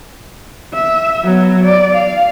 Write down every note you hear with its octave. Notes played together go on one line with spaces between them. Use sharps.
E5
F#3 B3
D5
F5